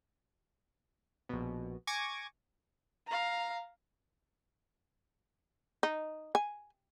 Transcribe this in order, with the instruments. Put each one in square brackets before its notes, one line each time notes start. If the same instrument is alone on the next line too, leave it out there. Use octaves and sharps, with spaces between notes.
[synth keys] A#1 B2
G#5 C#6 D6 G#6 A#6
[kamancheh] F5 A#5
[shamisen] D#4
G#5